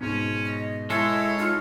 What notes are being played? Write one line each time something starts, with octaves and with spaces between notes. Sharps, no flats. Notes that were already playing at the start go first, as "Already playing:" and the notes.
G#2 B2 C#4
D#5
G#3 E4 A4 C#5
D#4 F4